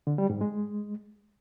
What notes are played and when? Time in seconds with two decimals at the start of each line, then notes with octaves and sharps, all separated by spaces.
0.07 D3
0.18 G3
0.30 G#2
0.41 G#3